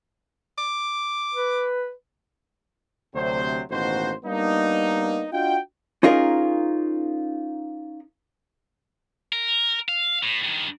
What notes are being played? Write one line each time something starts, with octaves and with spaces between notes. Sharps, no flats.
D6
B4
D2 C3 F#3 C5
A1 B2 D#3 A#3 F#4 C5
G3 A#3 B3 D4 D#4
D4 F4 F#4 D#5 G5
C#4 D#4 F4 G#4 A#4
A#4
F5
A2
G2 D#3